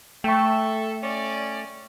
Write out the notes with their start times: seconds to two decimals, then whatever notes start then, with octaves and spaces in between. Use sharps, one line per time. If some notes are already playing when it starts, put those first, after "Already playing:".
0.24 A3 A4 E5 G5 C#6
1.02 C#4 D5